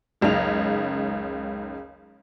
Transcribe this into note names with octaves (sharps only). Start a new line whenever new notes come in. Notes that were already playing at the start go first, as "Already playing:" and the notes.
F#1 C#2 C#3 D#4 F7